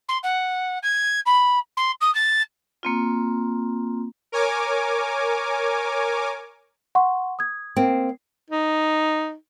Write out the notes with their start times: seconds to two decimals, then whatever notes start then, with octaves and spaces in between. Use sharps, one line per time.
0.08 C6
0.23 F#5
0.83 G#6
1.26 B5
1.77 C6
2.01 D#6
2.14 A6
2.83 A#3 C4 F4
4.32 A#4 C#5 G#5 D6
6.95 F#5 C6 C#6
7.39 D#6 G#6
7.76 A#3 C4
8.50 D#4